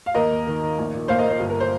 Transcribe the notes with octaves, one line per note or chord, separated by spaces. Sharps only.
F5
D#2 A#4 D#5
D#2
D#3
D#3
A#1
A#2
A#1 C5 F5
A#4 D#5
A#2 C5
G1
A#4
C5